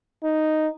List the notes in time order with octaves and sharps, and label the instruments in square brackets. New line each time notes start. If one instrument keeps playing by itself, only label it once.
[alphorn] D#4